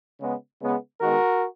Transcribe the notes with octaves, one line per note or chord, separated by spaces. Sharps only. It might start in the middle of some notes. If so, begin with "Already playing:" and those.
C#3 G#3 B3
C#3 G#3 B3
D#3 G#3 B3 F#4 A#4